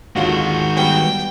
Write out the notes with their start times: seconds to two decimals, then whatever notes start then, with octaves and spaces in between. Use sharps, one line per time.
0.16 D#2 D3 D#3 G#3 F4 F#4
0.77 G3 B3 G5